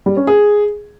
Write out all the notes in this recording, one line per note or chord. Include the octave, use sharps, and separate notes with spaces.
G3
C#4
G#4